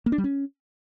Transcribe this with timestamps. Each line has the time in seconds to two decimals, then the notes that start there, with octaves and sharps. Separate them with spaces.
0.06 A#3
0.12 D4
0.18 G3
0.24 C#4